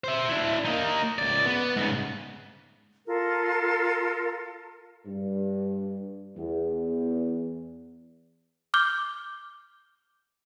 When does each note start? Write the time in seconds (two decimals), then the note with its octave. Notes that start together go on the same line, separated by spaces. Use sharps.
0.04 C5 E5
0.28 D4 E4
0.65 A#3 D#4
1.18 C#2 D5
1.46 B3
1.77 G#2 C#3
3.07 F4 A4 A#4
5.06 G2
6.37 E2
8.74 D6 F6 G6 G7